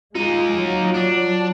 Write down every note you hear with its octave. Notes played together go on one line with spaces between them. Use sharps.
G#3 A#3 D#4 F4
F#3
D4